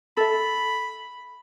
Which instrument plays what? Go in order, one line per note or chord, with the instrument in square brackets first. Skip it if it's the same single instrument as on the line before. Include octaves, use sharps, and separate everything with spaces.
[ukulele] A4 E5 [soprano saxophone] B5